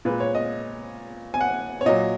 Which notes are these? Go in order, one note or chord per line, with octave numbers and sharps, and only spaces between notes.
A#2 G#3 B4
C#5
D#5
G#5
F#5
C#5
A#2 F#3 D#5